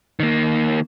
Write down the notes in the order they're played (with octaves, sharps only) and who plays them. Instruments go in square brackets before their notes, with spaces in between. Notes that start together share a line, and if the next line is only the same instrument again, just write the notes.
[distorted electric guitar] D#3 A#3